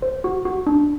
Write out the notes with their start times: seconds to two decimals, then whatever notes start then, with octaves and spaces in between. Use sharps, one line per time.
0.02 C5
0.24 F#4
0.45 F#4
0.67 D4